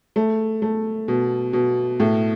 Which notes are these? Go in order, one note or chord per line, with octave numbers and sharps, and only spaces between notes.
A3
A3
B2
B2
A2